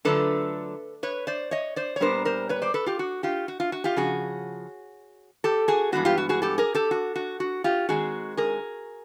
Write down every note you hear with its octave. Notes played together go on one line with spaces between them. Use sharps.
D3 F#3 A3 D4 F4 A4 B4
B4 C#5
C5 D5
C#5 D#5
C5 D5
C#5
A#2 G3 B3 D4 A#4 C5
A#4 C5
B4 C#5
C5 D5
A4 B4
F4 G4
F#4
F4 G4
F#4
F4
F#4
F4 G4
C#3 F3 F#4 G#4
G4 A4
F#4 G#4
G2 E3 G#3 B3 F#4
F4 G4
F#4
F#4 G#4
G4 A4
G#4 A#4
G4 A4
F#4
F#4
F#4
F4 G4
D#3 G#3 C4 F#4 G#4
G#4 A#4